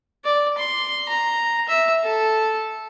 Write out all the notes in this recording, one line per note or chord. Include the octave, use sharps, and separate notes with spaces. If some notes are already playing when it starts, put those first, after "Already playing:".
D5
C6
A#5
E5
A4